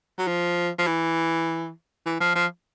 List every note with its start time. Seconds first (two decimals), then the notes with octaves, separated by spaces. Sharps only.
0.18 F#3
0.27 F3
0.79 F3
0.87 E3
2.06 E3
2.20 F3
2.35 F3